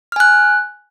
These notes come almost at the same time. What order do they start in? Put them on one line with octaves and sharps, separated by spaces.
F6 G#5 F#6